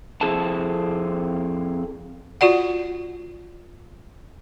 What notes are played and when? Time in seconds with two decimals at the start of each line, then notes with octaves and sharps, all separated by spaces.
0.21 F2 C4 E4 G#4 A4 A5
2.41 F4 F#4 D5 F#5